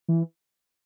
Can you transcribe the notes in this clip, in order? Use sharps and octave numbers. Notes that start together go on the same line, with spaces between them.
E3